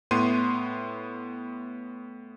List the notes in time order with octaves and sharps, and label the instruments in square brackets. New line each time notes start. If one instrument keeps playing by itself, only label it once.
[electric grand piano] A2 B3 C6 D#7